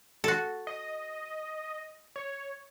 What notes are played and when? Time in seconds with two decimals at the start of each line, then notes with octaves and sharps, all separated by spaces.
0.24 F#4 A4
0.67 D#5
2.16 C#5